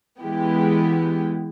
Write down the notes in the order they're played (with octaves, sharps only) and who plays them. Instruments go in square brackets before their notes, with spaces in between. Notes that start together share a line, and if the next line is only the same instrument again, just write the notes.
[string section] E3 G#3 B3 E4 G4